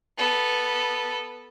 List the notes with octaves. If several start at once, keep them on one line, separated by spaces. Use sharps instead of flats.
B3 A4